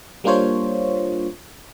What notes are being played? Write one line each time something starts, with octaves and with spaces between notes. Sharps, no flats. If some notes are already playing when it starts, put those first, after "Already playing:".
G3 A#3 D4 F4 C5 C#5